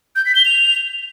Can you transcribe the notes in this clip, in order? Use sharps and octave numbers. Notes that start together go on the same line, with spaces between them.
G6
B6
G7
F7